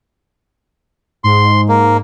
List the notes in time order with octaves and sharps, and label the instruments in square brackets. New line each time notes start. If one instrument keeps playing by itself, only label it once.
[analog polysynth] G#2 [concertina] C6
[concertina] A#3